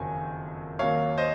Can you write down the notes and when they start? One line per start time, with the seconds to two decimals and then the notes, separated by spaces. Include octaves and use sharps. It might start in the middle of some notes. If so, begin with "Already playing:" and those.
Already playing: F#1 F2 D#3 F#3 G#5
0.79 D#2 D#3 F#3 A#3 C#5 F5
1.18 C5 D#5